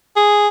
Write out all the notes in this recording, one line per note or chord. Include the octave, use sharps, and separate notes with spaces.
G#4